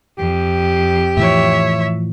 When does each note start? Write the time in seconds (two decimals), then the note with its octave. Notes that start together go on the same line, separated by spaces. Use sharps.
0.18 F2 G4
1.17 A2 E3 F3 C#5 E5